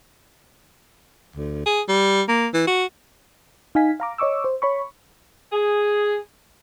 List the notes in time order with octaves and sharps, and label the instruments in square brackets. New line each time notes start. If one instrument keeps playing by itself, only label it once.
[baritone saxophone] D2
G#4
G3
A#3
E3
F#4
[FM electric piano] D#4 F5 G#5 B6
F5 A#5 D6
C#5 D#5 C#6 D6 E6
C5
C#5 B5 C#6
[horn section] G#4